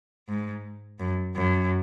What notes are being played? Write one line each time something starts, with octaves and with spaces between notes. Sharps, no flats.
G#2
F#2
F#2